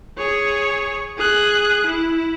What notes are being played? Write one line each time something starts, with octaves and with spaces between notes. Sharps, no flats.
G#4 C#5
G#4 F#6
E4